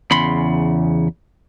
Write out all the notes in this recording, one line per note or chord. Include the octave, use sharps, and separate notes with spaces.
E2 C#3 B5 C6